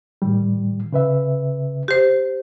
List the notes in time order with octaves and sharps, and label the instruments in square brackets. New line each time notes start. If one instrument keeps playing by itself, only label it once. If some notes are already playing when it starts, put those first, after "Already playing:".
[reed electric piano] A2 D#3 G3
C#3 B4 E5
[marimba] G4 C5